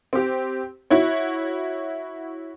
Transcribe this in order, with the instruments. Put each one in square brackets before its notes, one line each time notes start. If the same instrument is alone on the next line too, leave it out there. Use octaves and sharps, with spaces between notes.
[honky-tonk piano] C4 G4
E4 F#4 C#5